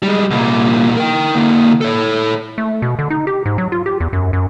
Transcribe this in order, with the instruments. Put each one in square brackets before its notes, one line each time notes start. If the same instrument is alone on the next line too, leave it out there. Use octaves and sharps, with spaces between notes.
[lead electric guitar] G3 G#3
C2 A#2
A#4 G5
D3 A#3
A4 C#5
[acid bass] A3
B2
D3
D#4
G4
G#2
F#3
F4
G4
E2
F#2
F#2